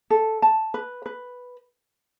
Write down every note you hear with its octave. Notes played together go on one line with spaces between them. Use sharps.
A4
A5
B4
B4